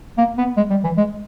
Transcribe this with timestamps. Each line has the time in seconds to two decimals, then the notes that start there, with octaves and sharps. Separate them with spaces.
0.18 A#3
0.38 B3
0.57 G#3
0.70 G3
0.84 E3
0.97 G#3